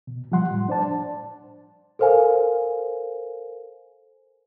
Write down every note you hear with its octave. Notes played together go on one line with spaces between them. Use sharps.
B2
F3 G3 F#5 C6
A2
D4 C5 D5 A5
A4 A#4 C5 F5 G#5